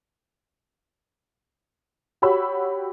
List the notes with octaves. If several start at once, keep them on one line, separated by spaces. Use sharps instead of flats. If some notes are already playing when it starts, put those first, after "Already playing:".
F#4 G4 C#5 B5 E6